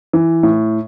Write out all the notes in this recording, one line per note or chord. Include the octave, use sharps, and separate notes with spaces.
E3
A2